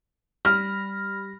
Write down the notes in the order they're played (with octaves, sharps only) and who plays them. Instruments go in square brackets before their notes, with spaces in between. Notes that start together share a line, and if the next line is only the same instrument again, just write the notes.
[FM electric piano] G3 B5 A#6 [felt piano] F6